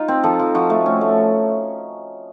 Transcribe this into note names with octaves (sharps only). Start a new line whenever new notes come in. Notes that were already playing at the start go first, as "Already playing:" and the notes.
Already playing: D#4 F4
C4
F3 A4
F3
F3 F#4
A3
C#4
A3